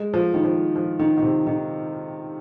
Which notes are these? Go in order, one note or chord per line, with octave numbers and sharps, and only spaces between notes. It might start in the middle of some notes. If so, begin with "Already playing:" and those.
Already playing: G#3
F3
D#3
F3
F3
D#3
D#3
C3
D#3